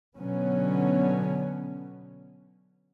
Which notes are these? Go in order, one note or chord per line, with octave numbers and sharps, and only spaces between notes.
B2 D3 F#3 B3 C#4